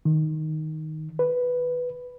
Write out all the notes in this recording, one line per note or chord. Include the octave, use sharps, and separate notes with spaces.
D#3
B4